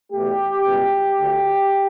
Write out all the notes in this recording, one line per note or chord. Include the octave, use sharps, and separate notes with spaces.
E2 B2 A3 G4
C#2 B2 G3
D2 D3 A3